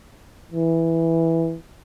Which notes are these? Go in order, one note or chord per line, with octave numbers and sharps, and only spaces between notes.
E3